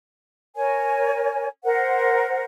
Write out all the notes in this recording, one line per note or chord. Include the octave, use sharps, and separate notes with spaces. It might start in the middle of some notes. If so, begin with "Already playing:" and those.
A#4 C#5 G#5
A#4 C5 F#5